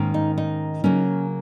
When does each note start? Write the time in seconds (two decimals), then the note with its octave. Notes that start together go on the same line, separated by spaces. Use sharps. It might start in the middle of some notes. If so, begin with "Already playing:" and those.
Already playing: G#2 D#3 A#3 C#4
0.14 D#4
0.38 D#4
0.84 C#3 F#3 A#3 C#4